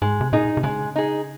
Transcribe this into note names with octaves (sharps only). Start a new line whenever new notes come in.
G#2 G#3
C3
A#2 D#4 G#4
C3
C#3 G#3
D#4 G#4